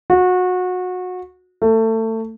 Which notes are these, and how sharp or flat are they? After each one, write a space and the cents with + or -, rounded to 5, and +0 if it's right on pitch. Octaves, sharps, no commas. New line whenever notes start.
F#4 -25
A3 +25